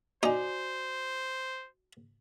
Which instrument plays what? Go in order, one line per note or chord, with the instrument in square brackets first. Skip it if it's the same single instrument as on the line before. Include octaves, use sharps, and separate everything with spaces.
[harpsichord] D#4 [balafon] F#4 D5 G#5 [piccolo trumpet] C5